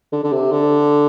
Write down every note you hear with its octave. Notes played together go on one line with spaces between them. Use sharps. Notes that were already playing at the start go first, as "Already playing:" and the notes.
D3
D3
C3
D3